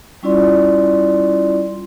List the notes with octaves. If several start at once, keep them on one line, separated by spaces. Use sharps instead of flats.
G3 C#4 E4 F4 D5 C6